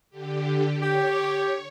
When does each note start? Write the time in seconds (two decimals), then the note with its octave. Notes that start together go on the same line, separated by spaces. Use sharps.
0.10 D3 G4
0.82 G4 C#5